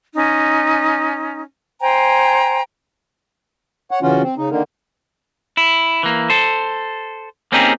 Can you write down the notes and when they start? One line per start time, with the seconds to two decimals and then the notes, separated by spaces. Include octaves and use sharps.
0.15 C#4 D#4
1.80 C5 G5 G#5 A#5
3.91 C#5 F#5
4.02 C#3 E3 C#4 F4 F#4
4.23 C4
4.38 C#3 D#4
4.50 D3 D#3 A#3
5.57 E4
6.03 E3 A#3
6.30 A4 C5
7.52 A#3 C4 C#4 D#4 G4 G#4